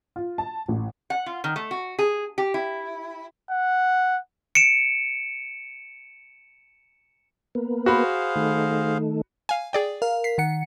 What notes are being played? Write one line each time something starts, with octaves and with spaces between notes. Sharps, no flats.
F4
A5
A1
F#5
F4
D#3
A3
F#4
G#4
G4
E4
F#5
C#7 D7 E7
A#3 B3
F#4 G#4 C5 F5 B5
D#3 A3
F5 G#5
G#4 D5 G5
A#4 F5
B6 C7
D#3 F#5 C#7